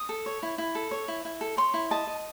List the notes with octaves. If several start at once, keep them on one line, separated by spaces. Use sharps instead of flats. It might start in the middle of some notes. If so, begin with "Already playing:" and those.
Already playing: D#6
A4
C#5
E4
E4
A4
C#5
E4
E4
A4
C#5 C6
E4
D#5 A5
D#5